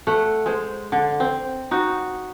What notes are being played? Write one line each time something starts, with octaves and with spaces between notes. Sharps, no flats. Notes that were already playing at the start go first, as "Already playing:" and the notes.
A3 F#5
G#3 C5
D3
C4
D#4 F#4